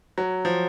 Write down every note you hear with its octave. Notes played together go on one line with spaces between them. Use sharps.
F#3
F3